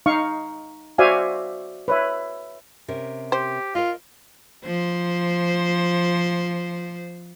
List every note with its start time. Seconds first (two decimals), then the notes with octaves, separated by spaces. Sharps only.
0.06 D#4 F5 C#6
0.98 F#4 C5 D5 E5 F5 G#5
1.88 B4 C#5 E5
2.88 C3 C#4 A#4
3.32 G4 C5
3.75 F4 A#4 D#5
4.66 F3 C5